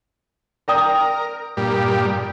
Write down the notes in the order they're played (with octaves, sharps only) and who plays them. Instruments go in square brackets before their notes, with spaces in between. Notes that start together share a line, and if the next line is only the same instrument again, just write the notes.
[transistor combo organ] A#4 [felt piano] D5 G5 D#6
[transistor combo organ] G2 A#2 G3